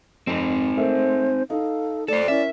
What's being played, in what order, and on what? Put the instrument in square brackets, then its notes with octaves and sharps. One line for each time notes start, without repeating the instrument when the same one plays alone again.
[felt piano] F2 [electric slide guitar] C4 D#4
[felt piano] A3 A#4 E5 [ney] C5
[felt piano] D#4 [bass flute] A4 [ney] F5
[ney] A3 [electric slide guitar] A4 C5 [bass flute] D5
[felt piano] C#4 E4 [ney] A#4 [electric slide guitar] E5